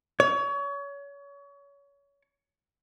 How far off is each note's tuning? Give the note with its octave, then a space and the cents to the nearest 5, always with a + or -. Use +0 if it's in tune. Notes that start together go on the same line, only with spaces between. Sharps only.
C#5 +30